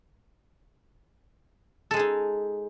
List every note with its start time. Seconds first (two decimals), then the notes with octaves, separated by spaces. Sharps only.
1.91 A4
1.94 G#3
1.96 G#4
1.99 D#4